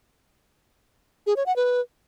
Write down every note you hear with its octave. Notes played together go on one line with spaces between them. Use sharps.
G#4
C#5
F#5
B4